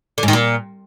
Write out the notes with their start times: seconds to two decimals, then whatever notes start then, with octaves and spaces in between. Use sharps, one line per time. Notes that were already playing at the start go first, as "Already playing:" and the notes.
0.18 D3
0.23 G#2
0.28 D#3
0.33 A#2